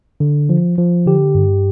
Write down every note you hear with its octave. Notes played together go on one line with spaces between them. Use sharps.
D3
F3
F3
D3 G4
G2